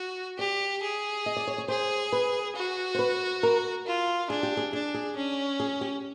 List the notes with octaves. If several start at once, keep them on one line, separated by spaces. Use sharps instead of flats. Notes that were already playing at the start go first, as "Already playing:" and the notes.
Already playing: F#4
G4 D5
G#4
D#5
D5
C#5
C#5
G#4 C5
B4
F#4
C5
B4
A#4
F4
D4 G#4
G4
G#4
D4 G#4
G#4
C#4
G#4
G4